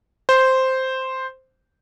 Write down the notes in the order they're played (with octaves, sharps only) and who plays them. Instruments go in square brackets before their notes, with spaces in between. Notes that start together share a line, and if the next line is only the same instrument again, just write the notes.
[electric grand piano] C5